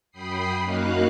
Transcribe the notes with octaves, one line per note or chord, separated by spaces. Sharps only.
F#2 G5 B5 D#6 C7
F#2 A#3 D#4 F#4 F5 F#6